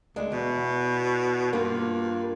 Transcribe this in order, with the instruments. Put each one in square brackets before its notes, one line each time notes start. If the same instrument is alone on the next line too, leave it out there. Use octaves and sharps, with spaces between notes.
[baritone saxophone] D2 [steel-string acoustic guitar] G#3 D4
[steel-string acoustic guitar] E2 [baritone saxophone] B2
[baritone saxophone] G2 [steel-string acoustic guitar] A#3 F4